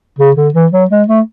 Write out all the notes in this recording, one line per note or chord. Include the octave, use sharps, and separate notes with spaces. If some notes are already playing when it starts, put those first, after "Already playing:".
C#3
D3
E3
F#3
G#3
A3